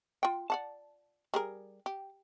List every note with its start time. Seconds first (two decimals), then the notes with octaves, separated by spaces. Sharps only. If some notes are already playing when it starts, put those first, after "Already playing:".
0.23 F4 G5
0.50 D5 F#5 A5
1.34 G3 G#4 A#4
1.86 G4